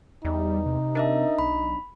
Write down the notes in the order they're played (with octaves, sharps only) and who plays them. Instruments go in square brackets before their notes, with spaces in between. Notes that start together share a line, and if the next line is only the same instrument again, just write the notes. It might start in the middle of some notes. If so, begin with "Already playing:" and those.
[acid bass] E2 [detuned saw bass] G3 [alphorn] D#4
[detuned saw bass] C3
[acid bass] D4 [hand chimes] A#4 D#5 E5
[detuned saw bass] B1 [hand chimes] B5